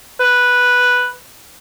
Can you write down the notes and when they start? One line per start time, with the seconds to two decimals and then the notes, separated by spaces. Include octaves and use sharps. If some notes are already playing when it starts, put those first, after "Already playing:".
0.20 B4